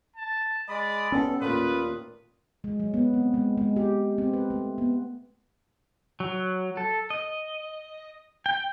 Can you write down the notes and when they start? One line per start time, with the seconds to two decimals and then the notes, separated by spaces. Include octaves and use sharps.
0.16 A5
0.69 G#3 D5 B5 D#6
1.12 G3 B3 C#4 A4
1.42 D#2 A#2 A3 F4 B4 D#6
2.64 G#3
2.80 F#3
2.94 B3
3.14 C4
3.34 G#3
3.58 G#3
3.76 G4
4.18 C4
4.34 B4
4.50 A3
4.78 B3
6.20 F#3
6.77 A4
7.10 D#5
8.46 G5